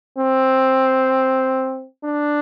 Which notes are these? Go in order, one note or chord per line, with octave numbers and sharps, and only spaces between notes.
C4
D4